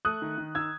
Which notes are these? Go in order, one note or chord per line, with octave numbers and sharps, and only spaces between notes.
A3 D#6 F#6
D#3
D#3
D#3 E6 G#6